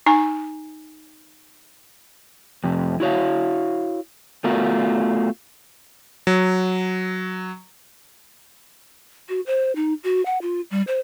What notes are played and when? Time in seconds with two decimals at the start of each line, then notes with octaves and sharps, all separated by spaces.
0.06 D#4 G#5 A#5
2.64 F2 C3
3.00 E4 F#4 C#5 F5
4.44 A3 B3 F4 F#4 A#4
6.27 F#3
9.29 F#4
9.47 C5
9.76 D#4
10.04 F#4
10.26 F#5
10.42 F4
10.71 G3
10.87 C5